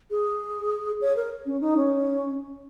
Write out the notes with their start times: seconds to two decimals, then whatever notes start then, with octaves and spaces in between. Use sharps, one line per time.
0.11 G#4
1.01 C#5
1.16 A#4
1.46 C#4
1.61 D#4
1.77 C#4